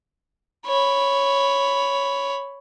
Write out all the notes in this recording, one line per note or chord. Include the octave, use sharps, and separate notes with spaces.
C#5 B5